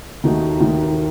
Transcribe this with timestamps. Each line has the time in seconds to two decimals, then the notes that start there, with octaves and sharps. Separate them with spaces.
0.24 D#2 D#3 A3 D#4 F#4
0.60 D#2 D#3 A3 D#4 F#4